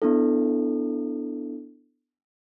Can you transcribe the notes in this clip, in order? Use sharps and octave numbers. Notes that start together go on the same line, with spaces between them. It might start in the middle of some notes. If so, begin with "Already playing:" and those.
B3 D4 E4 A4